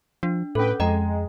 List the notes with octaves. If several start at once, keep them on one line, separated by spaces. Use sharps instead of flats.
F3 D4
A2 C#4 A4 B4 G5
F2 G#3 D#5 G5 A#5